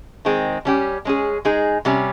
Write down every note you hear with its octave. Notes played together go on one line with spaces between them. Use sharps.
D#3 G#3 C4
G3 C#4 G4
G#3 C#4 G#4
G#3 D#4 G#4
C3 G3 C#4